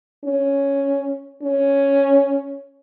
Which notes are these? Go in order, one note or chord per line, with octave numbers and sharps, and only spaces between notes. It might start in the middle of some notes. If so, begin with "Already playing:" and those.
C#4
C#4